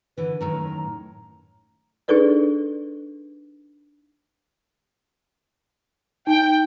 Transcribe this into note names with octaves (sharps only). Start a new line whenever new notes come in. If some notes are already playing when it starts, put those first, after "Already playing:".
D3 E3 B4
F#2 A2 D#3 A#5
D4 D#4 G#4 A4 B4 D5
D#4 G5